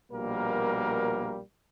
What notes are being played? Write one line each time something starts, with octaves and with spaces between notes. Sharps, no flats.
A#1 B2 G3 A#3 A#4